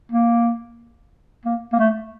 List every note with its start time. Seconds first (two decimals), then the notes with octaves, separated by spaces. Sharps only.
0.12 A#3
1.45 A#3
1.73 A#3
1.79 A3